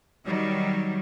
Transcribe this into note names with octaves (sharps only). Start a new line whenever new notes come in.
D#3 F#3 G3